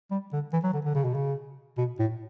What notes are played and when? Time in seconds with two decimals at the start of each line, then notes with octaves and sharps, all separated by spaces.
0.11 G3
0.33 D3
0.53 E3
0.63 F#3
0.74 D3
0.85 D3
0.95 C#3
1.04 B2
1.14 C#3
1.78 B2
1.99 A2